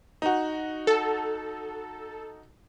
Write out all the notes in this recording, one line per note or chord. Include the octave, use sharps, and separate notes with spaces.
D#4 F#4
A4